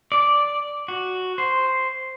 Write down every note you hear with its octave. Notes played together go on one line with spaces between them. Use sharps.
D5
F#4
C5